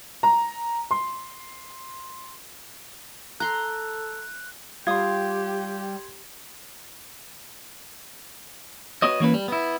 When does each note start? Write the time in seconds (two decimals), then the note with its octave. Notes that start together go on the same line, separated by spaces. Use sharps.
0.23 A#5
0.91 C6
3.40 A4 A#5 C6 F#6
4.87 G3 F4 G4 C6 D#6 G#6
9.02 B3 F#4 C#5 D#5
9.20 E3 A#3 C#4 B4
9.34 G3
9.48 B3 E4